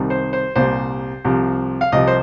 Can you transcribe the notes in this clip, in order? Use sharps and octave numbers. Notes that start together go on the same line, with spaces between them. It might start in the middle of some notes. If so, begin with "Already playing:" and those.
Already playing: C2 C3 D#3 G3
C5
C5
C2 A#2 G3 C5
C2 C3 F3
F5
C2 C3 F3 D#5
C5